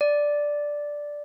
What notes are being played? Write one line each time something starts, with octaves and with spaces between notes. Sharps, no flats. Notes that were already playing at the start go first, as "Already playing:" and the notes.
D5